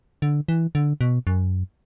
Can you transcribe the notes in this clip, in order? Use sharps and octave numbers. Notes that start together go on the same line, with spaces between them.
D3
E3
D3
B2
F#2